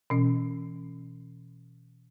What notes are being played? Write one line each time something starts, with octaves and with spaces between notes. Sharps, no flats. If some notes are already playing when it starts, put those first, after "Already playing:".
B2 E3 C#4